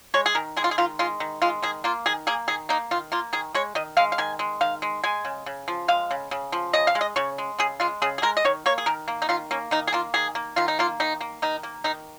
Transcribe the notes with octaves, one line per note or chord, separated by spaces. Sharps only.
G#3 C#5
G#4
D#3 A#4
G#3 G#4
F4
G#4
D#3 F4
G#3 F4
D#3
G#3 F4
D#3 G#4
A#3 F4
D#3 G#4
A#3 G#4
D#3 G#4
A#3 D#4
D#3 F4
A#3 F4
D#3 G#4
G#3 C#5
D#3 D#5
G#3 F5
F5
D#3 G#5
G#3
D#3 F5
G#3
G#3 G#5
C#3
C#3
F3
G#3 F5
C#3
C#3
F3
C#3 D#5
F5
G#3
D#5
C#3 C#5
G#3
C#3 G#4
G#3 F4
C#3 G#4
G#4
G#3 A#4
D#5
D#3 C#5
A#3 C#5
G#4
D#3 A#4
A#3
D#4
D#3 F4
A#3 C#4
D#3 D#4
G#4
A#3 F4
D#3 G#4
A#3
D#3 F4
D#4
A#3 F4
D#3 D#4
A#3
D#3 D#4
A#3
D#3 D#4